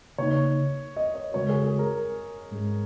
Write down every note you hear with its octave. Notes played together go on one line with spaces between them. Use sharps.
C#3 A#3 D#4 C#5
D#5
C#5
C#3 G#3 F#4 A#4 C#5
G#4
G#4
A#4
G#2 G#3 C#4 G#4